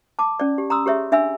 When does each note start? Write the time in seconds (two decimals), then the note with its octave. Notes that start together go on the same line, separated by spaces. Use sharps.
0.19 A5 D6
0.40 C#4 D5
0.58 G4
0.70 A#5 C6 D#6 E6
0.86 G4 G#4 C#5 E5
1.12 D4 E5 G#5 B5 E6